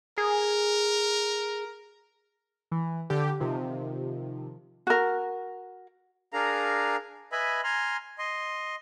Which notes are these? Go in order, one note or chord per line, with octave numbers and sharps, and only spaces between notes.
G#4 A#4
E3
D3 G4
C3 D#3 F3
F#4 A#4
D4 G#4 A#4 F5 A#5
B4 D#5 E5 G#5 B5
G#5 A#5 C6 F6
D#5 C6